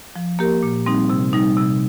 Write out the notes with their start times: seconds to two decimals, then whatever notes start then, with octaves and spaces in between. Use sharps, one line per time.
0.16 F3
0.39 A#3 G4 A#4
0.63 A#2
0.86 G3 C4 D#4
1.10 C3
1.33 G3 D#4
1.57 C3